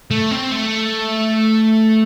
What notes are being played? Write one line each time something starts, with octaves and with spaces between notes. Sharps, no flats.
A3
C4
A3